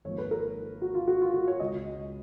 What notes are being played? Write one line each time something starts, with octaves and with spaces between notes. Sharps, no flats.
G#1 G#2 F3 A#3 C#5
B4
A#4
F#4
F4
F#4
F4
F#4
C#5
C#2 C#3 G#3 D#5